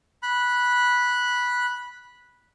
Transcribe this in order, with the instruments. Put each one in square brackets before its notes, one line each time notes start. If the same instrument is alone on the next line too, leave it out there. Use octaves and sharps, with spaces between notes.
[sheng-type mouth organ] B5 F#6